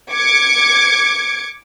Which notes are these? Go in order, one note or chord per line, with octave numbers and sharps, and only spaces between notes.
D6 G#6 C#7